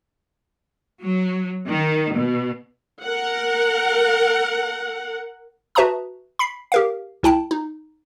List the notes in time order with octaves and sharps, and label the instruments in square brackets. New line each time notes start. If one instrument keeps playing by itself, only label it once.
[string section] F#3
D#3
B2
[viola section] A#4 F#5
[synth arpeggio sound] F#4 B4 E5 A5 A#5 D#6
B5 B6 C7
G4 A#4 F5
C#2 E4 G5 A5
D#4